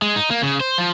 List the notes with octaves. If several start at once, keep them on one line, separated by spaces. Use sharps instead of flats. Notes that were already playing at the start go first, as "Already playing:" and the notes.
G#3
D#4
A#3
C#3
C5
F3